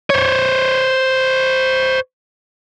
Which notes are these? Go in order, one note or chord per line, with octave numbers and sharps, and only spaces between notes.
C5 C#5